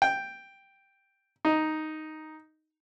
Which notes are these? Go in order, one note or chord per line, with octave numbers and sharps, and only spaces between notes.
G5
D#4